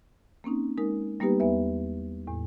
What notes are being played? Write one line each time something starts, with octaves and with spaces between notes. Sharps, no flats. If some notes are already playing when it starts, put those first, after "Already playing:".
A#3 C4 C#4 D#4
G#3 D#4 A#4
G3 A#3 B3 D#4 G4 B4
E2 B3 B4 E5
E2 A2